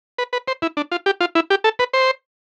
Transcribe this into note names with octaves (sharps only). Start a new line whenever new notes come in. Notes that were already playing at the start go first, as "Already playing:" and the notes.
B4
B4
C5
E4
D4
F4
G4
F4
E4
G4
A4
B4
C5